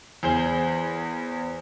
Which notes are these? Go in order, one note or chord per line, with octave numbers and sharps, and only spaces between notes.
E2 G#4 C5 G7